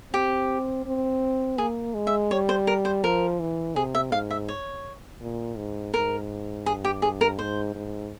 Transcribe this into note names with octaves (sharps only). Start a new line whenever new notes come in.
C4 G4
C4
A#3 G#4
G#3
E5
G3 C#5
C5
A#4
C5
F3 A#4
E3
C3 G#4
E5
G#2 F5
E5
C#5
A#2
G#2
G#2 A#4
G2 G#4
G4
G#4
A#4
G#2 C5
G#2